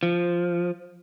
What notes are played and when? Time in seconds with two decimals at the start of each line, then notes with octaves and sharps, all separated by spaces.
0.03 F3